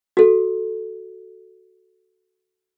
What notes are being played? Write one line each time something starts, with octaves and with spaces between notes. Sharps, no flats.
F#4 A4